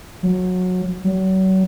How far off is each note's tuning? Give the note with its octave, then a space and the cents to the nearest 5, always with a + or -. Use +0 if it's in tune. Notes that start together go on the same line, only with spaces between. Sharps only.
F#3 -20
F#3 +35